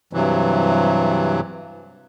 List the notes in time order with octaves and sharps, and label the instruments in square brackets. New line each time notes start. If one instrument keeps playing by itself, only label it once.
[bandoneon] G2 C3 E3 F#3